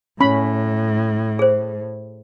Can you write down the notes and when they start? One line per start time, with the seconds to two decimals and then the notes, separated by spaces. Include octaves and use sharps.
0.20 A2 C#4 B5
1.39 G#4 C5